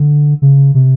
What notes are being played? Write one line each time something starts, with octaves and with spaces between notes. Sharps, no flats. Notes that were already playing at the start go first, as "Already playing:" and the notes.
Already playing: D3
C#3
C3